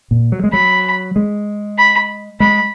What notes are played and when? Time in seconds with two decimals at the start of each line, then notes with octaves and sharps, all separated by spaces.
0.11 A#2
0.32 F#3
0.44 G#3
0.53 F#3 B5
1.16 G#3
1.78 B5
2.40 G#3 B5